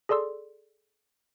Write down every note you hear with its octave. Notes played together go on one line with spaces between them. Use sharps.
G#4 A4 D5 C6 E6